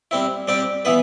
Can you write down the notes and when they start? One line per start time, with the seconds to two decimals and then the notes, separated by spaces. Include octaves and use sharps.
0.11 G3 C4 E4
0.48 G3 C4 G4 D5
0.85 E3 B3 E4 B4